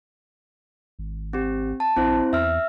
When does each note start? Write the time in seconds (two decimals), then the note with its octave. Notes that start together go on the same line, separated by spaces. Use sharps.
0.99 G#1
1.33 C4 G4
1.80 A5
1.97 A#1 C4 E4 C5
2.33 E2 E5 E6 F6